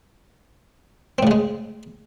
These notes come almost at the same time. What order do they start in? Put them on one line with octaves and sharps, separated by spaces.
C4 A2 C#3 G#3